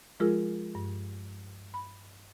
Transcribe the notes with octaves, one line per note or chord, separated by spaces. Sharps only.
F3 G#3 F4 G#4 A#4 E6
G2
B5